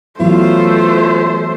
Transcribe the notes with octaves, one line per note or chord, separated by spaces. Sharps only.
E3 F#3 A3 B3 F4 C5